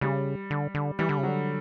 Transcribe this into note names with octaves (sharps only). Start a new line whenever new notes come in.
C#3 G3
D3
D3
E3 G3
D3
C#3
D3 F#3